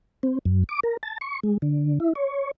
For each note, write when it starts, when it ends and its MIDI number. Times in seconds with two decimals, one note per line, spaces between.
0.23 0.39 60
0.45 0.64 42
0.69 0.80 86
0.83 0.97 70
1.03 1.18 81
1.21 1.40 85
1.43 1.58 56
1.62 1.99 50
2.00 2.13 64
2.15 2.51 73